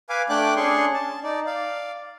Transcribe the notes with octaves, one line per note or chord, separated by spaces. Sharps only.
B4 F5 G#5 D6
A3 D4 D5 G5 D6 F#6
C#4 D4 G#4 C6 C#6
A5
D#4 D5
D5 F5